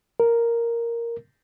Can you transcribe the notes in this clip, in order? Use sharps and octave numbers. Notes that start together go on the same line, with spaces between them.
A#4